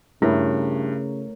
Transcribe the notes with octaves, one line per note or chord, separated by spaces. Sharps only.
G2 C#3 A3 E4 A#4 C#5